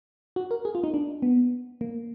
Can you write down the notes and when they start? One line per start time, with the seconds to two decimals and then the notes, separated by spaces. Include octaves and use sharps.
0.36 F#4
0.51 A#4
0.65 G#4
0.75 F4
0.84 D#4
0.94 D4
1.22 B3
1.81 A#3